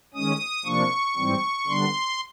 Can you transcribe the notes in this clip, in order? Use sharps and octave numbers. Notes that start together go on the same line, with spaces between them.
D#3 G#3 C#4 D#6
C3 F3 A#3 D4 C#6
G#2 E3 G3 C4
D3 G3 B3 D4 C6